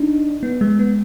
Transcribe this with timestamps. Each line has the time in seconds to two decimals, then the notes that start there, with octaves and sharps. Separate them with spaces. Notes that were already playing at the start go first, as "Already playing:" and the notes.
Already playing: D4 D#4
0.43 B3
0.61 G#3
0.79 B3